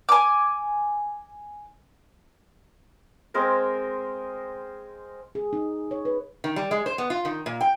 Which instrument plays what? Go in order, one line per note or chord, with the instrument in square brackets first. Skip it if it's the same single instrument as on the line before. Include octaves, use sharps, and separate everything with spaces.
[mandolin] G#5 D6
[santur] G#3 C4 A#4 C5
[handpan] G#4
D#4
C#5
B4
[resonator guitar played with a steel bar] D#3
G3
G#3
C5
B3
F4
D#3
A#2
G5